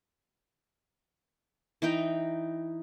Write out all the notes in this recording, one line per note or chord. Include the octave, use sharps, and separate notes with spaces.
E3 D#4 G5 A#5